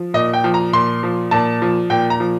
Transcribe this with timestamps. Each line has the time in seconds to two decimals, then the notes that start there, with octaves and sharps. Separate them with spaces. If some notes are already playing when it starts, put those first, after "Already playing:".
Already playing: F3
0.14 A#2 D#5
0.33 G5
0.44 F3
0.54 A#5
0.73 A#2 C6
1.03 F3
1.31 A#2 A5
1.62 F3
1.90 A#2 G5
2.10 A#5
2.20 F3